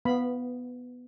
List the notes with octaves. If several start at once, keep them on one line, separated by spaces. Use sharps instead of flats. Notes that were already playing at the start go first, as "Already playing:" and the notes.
B3 F5 B5